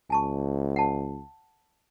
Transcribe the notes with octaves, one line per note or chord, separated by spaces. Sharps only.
C#2 G#5 A5 C#6
F#5 A5